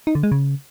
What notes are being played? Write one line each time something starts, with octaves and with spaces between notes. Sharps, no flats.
D#4
D3
G#3
C#3